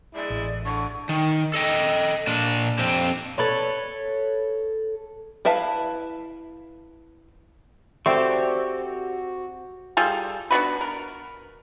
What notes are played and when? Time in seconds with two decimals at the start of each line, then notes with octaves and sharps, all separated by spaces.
0.15 G#3 E4 D5
0.30 A1
0.64 D3 C#6
1.09 D#3
1.54 A4 D#5 G5
2.27 A#2 D4
2.79 F2 C4 G4
3.38 A4 B4 C#5
5.45 E4 B4 E5 F5 A5
8.06 C4 F#4 G4 A4 D5 E5 C#6
9.97 G3 F4 G#4 A4
10.51 B3 D4 F#4 B4
10.81 A#4